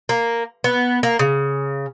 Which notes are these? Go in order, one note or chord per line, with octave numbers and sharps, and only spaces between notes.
A#3
B3
A#3
C#3